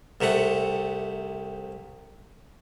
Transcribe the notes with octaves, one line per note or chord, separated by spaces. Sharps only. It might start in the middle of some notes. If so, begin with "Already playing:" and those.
C2 C3 A3 F#5